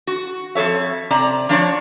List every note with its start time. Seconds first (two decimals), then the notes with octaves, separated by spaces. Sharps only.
0.07 F#4
0.55 F2 A4 C#5 E5
1.10 C3 D5 A#5
1.49 F3 D4 C#5 D5